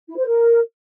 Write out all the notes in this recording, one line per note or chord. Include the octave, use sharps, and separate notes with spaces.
E4
C5
A#4